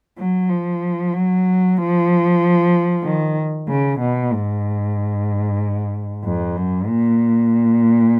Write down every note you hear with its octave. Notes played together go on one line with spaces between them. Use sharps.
F#3
F3
F#3
F3
D#3
C#3
B2
G#2
F2
F#2
A#2